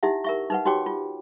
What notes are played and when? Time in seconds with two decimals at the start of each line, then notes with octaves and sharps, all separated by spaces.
0.03 D#4 E4 G4 E5 F#5
0.24 A#4 E5 C#6
0.50 D#4 B4 F#5
0.65 D#4 F#4 G4 C#5 G5 D6
0.86 F4